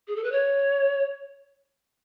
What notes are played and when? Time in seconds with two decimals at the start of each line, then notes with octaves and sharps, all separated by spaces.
0.07 G#4
0.16 A4
0.23 B4
0.32 C#5